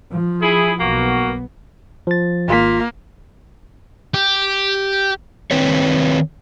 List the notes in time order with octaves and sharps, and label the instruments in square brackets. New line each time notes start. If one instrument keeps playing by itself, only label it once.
[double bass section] F3
[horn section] E4 G#4
[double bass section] B1 B3 [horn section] A#3 F#4
[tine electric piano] F3 A6
[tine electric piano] G#1 F4 B6 [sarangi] A#3
[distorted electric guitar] G4
[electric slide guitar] D#3 C4 B4 C#5